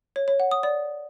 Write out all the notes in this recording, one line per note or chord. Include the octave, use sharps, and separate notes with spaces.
C#5
C#5
F#5
D#6
D5